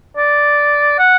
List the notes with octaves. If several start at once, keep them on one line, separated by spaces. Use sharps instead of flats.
D5
F#5